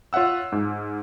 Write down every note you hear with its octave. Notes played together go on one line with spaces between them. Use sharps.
F4 C#5 E5 F#5 E6
G#2